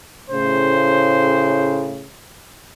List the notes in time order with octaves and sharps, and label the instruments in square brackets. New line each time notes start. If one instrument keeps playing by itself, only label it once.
[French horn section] A2 C#3 [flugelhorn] C5